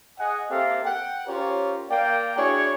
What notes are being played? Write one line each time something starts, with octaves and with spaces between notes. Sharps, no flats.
G#4 D#5 F#5 G#5
A#3 C4 G4 A4 E5 F5
F#5 G5
C#4 F4 G4 A#4 C5 C#5
A#3 A#4 D5 F5 G5
D4 E4 F#4 G#4 C#5